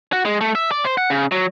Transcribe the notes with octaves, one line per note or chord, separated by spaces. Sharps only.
F#4
G#3
A3
E5
D5
C5
F#5
C#3
F#3